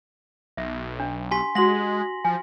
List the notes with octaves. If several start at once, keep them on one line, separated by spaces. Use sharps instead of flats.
B1 E5
D4
G4 G#5 C6 B6
G#3 F#4 F#5 A#6 F#7
F3 G#5